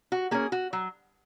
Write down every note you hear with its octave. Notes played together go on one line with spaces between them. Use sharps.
F#4
A#3 C#4 G#4
F#4
F#3